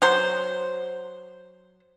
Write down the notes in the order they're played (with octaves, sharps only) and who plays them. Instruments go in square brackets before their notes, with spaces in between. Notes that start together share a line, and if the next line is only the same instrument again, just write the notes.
[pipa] F#3 C5